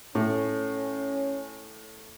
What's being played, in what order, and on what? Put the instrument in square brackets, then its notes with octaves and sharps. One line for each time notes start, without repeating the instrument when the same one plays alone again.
[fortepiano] A2 [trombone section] C#4